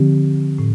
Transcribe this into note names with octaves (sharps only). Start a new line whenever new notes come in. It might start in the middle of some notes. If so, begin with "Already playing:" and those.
Already playing: D3 F3 C4 G4
A2